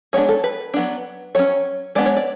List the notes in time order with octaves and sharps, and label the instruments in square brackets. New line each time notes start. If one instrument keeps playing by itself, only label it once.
[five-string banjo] G#3 B3 D4 C#5
A4
B4
F#3 B3 D4
F#3 C#4 C#5
G#3 B3 D4 D5
C#5
D5